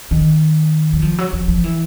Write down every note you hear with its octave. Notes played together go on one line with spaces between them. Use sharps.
D#3
F#3
F3
F#3
F3
F3
E3